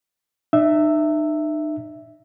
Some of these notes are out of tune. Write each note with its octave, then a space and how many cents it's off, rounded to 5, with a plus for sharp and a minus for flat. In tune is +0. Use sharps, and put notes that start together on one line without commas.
D#4 -40 E5 +0